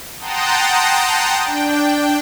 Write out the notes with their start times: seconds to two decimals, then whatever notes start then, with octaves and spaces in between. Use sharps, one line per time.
0.20 F#5 G5 A5 A#5 C6 D#6
1.43 D4 G5